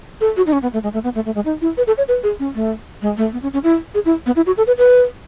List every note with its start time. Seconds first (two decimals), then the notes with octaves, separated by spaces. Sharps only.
0.21 A4
0.37 F#4
0.47 D#4
0.53 C#4
0.62 B3
0.73 A3
0.83 G#3
0.93 A3
1.04 B3
1.15 A3
1.26 A3
1.35 G#3
1.45 D#4
1.62 E4
1.77 B4
1.87 A4
1.98 C#5
2.08 B4
2.23 G#4
2.40 C#4
2.55 A3
3.02 G#3
3.17 A3
3.33 B3
3.42 C#4
3.53 C#4
3.64 E4
3.94 G#4
4.05 E4
4.26 B3
4.36 E4
4.47 F#4
4.57 A4
4.67 B4
4.78 B4